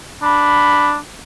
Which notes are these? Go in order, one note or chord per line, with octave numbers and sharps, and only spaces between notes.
D4 B5